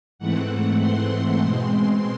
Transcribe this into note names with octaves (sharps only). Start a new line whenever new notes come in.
G#2 E3 A3 C4 F#5
C6
B2 G#3 C4